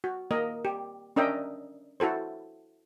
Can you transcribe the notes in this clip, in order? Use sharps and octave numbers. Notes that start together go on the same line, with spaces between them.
F#4
A#3 A#4 D#5
G4
C#4 D4 A#4 D#5 E5 G5
E4 F#4 A4 C5